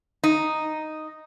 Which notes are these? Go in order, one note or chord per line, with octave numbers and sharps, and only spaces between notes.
D#4